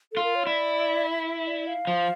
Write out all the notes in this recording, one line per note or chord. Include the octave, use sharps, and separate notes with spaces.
F4 A4
A#4
C#5
E4 D5
E5
E5
D5
F5
F3